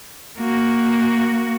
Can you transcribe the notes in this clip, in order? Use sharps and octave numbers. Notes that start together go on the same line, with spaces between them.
A#3 F#4